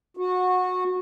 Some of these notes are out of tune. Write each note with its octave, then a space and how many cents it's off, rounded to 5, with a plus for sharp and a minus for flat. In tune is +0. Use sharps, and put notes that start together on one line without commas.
F#4 -20